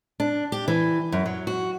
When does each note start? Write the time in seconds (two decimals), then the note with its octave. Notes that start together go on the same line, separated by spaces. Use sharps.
0.20 D4
0.52 G4
0.68 E3
1.12 F#2
1.26 F#3
1.47 F#4